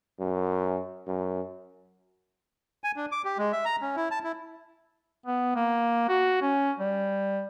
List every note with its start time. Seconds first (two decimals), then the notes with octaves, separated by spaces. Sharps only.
0.20 F#2
1.07 F#2
2.84 G#5
2.96 D4
3.12 D6
3.24 G4
3.38 G#3
3.53 E5
3.65 A#5
3.82 C#4
3.96 E4
4.11 A5
4.24 E4
5.26 B3
5.56 A#3
6.09 F#4
6.42 C#4
6.79 G3